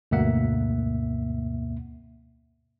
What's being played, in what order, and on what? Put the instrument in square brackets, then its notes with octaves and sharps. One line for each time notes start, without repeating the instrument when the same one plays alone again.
[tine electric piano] D2 G2 B2 A#3 E5 F#5